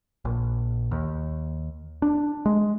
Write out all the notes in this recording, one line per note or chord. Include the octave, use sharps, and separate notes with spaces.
A#1
D#2
D4
G#3